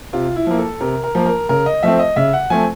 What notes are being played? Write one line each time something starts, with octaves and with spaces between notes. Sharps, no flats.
C3 F4
E4
F3 A#3
A4
C3 A#4
A#4
F3 A#3
A#4
C#3 A#4
D#5
F3 A3 C4 E5
D#5
C#3 E5
F#5
F3 A3 C4 G#5